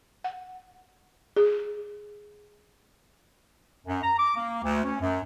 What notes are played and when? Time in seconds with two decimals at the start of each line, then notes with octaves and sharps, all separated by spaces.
0.24 F#5
1.37 G#4
3.87 F#2
4.03 A#5
4.19 D6
4.36 A#3
4.63 D2
4.84 C#4
5.01 F#2